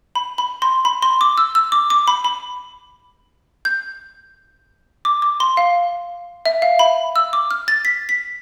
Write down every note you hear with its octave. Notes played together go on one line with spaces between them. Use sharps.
B5
B5
C6
B5
C6
D6
E6
E6
D6
D6
B5
B5
G6
D6
D6
C6
F5
E5
F5
B5
E6
D6
F6
A6
B6
B6